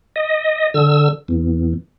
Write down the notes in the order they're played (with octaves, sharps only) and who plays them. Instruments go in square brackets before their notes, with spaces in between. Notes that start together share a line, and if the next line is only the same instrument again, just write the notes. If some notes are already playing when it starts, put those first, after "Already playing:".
[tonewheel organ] D#5
D3 E6
E2